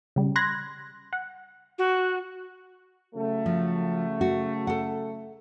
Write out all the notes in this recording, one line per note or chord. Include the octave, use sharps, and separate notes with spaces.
C#3 G3
B5 C6 F#6 G#6 A#6
F#5
F#4
C#3 F#3 A3
F3
F#4
A4 F#5